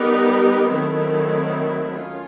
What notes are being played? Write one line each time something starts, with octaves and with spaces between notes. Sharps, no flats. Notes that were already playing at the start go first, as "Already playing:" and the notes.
Already playing: G3 B3 D#4 G4 A#4
D#3 F#3 A3 C4 E4
C#4 F4